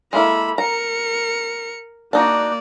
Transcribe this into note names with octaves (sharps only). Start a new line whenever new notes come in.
G#3 A#3 E4 A4 B5
A#4 A#5 C#7
A#3 D4 D#4 F#4 D5